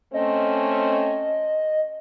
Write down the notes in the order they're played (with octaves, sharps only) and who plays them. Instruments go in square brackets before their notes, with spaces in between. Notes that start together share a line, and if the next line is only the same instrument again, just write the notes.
[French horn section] A3 C4 C#4 [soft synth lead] D#5